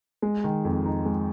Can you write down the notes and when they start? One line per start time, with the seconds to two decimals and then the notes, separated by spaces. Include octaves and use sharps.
0.22 G#3
0.44 D#3
0.65 F2
0.85 D#4
1.05 G#3